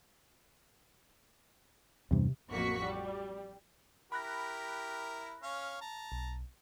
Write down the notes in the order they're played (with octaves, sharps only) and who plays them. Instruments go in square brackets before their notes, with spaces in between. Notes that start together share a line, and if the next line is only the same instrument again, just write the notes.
[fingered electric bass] E2 G2 [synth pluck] C3
[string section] A1 F2 A#3 F#4 C#6 B6
G3
[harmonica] E4 G4 A#4 [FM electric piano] B5 F#6 A#6
[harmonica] C#4 C#5 F5
A5 A#5
[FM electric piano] B1